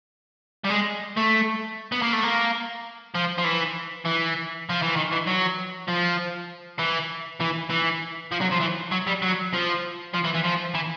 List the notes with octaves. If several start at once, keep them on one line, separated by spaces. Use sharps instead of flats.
G3
G#3
A3
B3
A#3
A3
A#3
F3
F3
E3
E3
F3
E3
D#3
E3
F#3
F3
E3
E3
E3
F3
F#3
F3
E3
F#3
G3
F#3
F3
F3
E3
E3
F3
E3